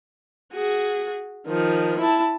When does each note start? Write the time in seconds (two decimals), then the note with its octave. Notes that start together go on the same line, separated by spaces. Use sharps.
0.53 F#4 G#4
1.47 D#3 F3
1.99 E4 A5